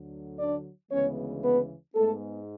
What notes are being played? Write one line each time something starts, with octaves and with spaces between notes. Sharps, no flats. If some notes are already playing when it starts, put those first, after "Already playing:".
Already playing: D2 D3 F#3
D4 D5
D2 C#3 E3 G#3 B3 C#4 C#5
B3 B4
G#2 G#3 A3 B3 A4